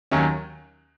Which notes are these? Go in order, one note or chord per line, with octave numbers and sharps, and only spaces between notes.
D#2 D#3 F#3 C#4